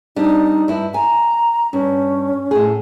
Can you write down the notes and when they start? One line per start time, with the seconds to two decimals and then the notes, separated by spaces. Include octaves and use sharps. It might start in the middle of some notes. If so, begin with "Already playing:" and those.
0.16 G3 C4 D4 D#4
0.68 G2 E4
0.94 G#5 A#5
1.73 G2 C#4
2.51 A2 G#4